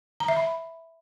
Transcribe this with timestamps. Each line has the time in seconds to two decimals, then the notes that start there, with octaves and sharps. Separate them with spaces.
0.20 A#5
0.28 E5
0.36 B5